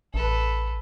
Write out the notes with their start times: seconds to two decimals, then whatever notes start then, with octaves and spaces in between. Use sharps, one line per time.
0.14 A1 A4 B4